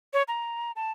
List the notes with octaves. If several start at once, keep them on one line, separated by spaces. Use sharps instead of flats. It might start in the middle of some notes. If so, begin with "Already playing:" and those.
C#5
A#5
A5